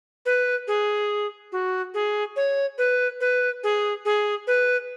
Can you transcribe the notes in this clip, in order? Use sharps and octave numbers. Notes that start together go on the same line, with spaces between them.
B4
G#4
F#4
G#4
C#5
B4
B4
G#4
G#4
B4